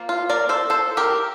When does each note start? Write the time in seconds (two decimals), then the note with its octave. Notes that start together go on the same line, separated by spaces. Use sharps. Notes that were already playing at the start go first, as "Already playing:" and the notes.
Already playing: F3 A#3
0.09 F4
0.29 A#4 D5
0.49 A4 C5
0.70 A4 C5
0.97 G4 A#4